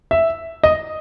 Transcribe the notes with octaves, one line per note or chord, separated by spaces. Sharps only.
E5
D#5